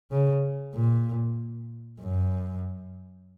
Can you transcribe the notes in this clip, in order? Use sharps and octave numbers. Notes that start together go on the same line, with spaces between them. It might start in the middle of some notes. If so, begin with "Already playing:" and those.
C#3
A#2
F#2